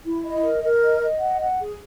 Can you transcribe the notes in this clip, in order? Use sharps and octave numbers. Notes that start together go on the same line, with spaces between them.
E4
D#5
A#4
A#4
D#5
D#5
F#5
F#5
G#4